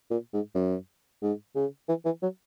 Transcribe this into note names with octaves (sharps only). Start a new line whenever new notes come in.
A#2
G#2
F#2
G#2
C#3
E3
E3
F#3